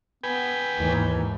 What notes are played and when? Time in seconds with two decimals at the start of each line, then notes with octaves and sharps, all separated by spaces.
0.24 B3 B4 G5 G#5
0.76 D#2 G#2 E3